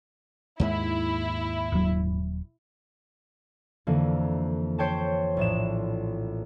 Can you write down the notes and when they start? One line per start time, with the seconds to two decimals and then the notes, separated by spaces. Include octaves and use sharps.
0.60 D#2 G#2 G#3 E4
1.72 D#1 F#3
3.87 F2 D3 E3 A#3
4.78 C5 C#5 G5 A5
5.37 A#1 A2 E7